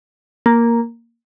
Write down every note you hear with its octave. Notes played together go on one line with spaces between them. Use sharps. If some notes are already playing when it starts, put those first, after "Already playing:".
A#3